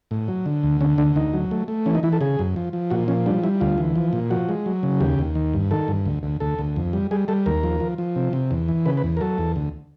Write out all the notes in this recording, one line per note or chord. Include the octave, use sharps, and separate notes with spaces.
A2
F#3
D3
D2
D3 C#4
D2 D4
D2 D#4
F#3
A3
A3
E3 C#4
D#4
E3 E4
A4
C#3 G#4
F#2
F3
F3
A#2 F#4
F3 C#4
G3 D4
G3 E4
D2 F4
E3
F3
A#2
F3 F#4
G#3
F#3
C#3
D#2 G4
D#2
D#3
G2
D#3 A4
G2
D2
D2
D2 A4
D2
F2
G3
G3 G#4
G3 A4
D#2 A#4
F3
F3
F3
C3
C3
E2
E3
C#3 B4
B4
E2
A#4
F#3 A4
E2
D2